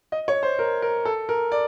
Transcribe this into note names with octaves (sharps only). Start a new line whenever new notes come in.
D#5
C#5
C5
A#4
A#4
A4
A#4
D5